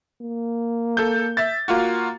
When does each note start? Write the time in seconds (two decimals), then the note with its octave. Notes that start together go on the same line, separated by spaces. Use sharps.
0.22 A#3
0.97 A4 G6
1.37 E5 A6
1.68 A#3 F4 F#4